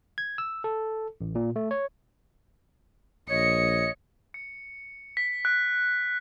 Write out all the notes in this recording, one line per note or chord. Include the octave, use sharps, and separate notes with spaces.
G#6
E6
A4
A1
A#2
A3
C#5
A#1 C#5 D#5 C#7
C#7
B6
F#6